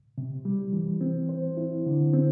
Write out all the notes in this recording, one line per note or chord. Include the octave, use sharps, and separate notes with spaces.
C3
G3
E3
C4
C5
E4
D3
C4